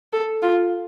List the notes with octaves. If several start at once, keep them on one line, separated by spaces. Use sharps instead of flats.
A4
F4